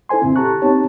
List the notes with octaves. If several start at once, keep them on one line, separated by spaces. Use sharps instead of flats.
E4 A4 C5 G#5 C6
F#2 A#2 D3 C4 E4
G4 A4 A5 A#5 C#6 F#6
B3 C4 D#4 G4 C#5 A5